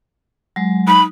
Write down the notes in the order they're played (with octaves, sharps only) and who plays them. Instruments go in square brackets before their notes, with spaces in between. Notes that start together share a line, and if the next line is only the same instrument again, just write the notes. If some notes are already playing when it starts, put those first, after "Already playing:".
[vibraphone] F#3 G#3
[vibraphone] D#4 [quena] B5